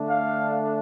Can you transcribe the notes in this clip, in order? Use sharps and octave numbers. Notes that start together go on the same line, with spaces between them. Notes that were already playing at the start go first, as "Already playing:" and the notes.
Already playing: D3 A3 D4
F5